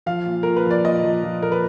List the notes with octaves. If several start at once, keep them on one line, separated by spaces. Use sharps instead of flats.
F3 F5
A#2
A#2 A#4
B4
F3
D5
A#2 D#5
F3
F3
A#2 A#4
B4